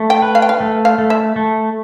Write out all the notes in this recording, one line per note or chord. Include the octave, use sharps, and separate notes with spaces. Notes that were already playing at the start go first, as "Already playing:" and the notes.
Already playing: A3
G5
B4
F5
G5
F5
A3
F5
A3
E5
A3